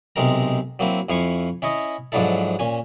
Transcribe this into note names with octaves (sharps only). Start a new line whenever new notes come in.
B1 C3 G#3 C4 A#4 A#5
F#3 A#3 C4 E4
F2 F3 E4 F5 G#5 C#6
C#4 E4 C#5 D#5
G#2 F3 F#3 D4 E4 A4
A#2 C#4 G#5